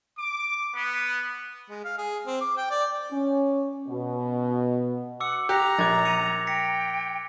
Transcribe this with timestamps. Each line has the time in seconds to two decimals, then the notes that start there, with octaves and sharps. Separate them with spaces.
0.19 D6
0.76 B3
1.70 G#3
1.85 F5
1.98 G#4
2.26 C4
2.41 D6
2.57 G5
2.70 D5
3.12 C#4
3.88 B2
5.20 F#5 D6 E6 C#7
5.49 G4 A#5 F#6
5.79 A#1 D6 G#6 A6
6.05 C#7 D#7 F7
6.47 G5 A#6 B6 C#7